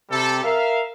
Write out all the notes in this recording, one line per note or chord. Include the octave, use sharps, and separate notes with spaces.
C3 G3 A4
A#4 E5 F5